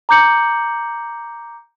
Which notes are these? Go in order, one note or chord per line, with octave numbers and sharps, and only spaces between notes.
A#5 D6 G6 C#7 F#7